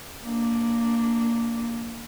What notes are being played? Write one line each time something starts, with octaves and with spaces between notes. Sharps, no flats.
A#3 D4